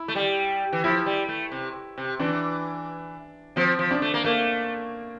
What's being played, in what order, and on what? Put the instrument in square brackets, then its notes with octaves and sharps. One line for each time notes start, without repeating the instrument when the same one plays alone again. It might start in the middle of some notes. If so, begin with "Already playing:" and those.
Already playing: [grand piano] E4
[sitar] A3
G3
E3
[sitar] F3 [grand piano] E4
[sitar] G3
A3
C3
C3
[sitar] E3 [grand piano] D4
[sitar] F3 [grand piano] C4
[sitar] F3
[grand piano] D4
[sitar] A3
A#3
[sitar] A3 [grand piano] A#3